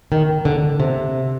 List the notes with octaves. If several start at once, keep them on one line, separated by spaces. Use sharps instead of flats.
D#3
D3
C3